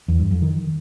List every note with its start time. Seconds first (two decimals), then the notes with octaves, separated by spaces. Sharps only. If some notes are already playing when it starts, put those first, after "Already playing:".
0.08 E2
0.20 G2
0.31 F2
0.42 D#3